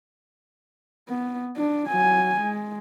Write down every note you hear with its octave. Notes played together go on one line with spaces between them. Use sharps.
B3
D4
F#3 G#5
G#3